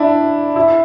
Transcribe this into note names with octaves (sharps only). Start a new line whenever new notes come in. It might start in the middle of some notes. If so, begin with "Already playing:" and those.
Already playing: D4 E4
E4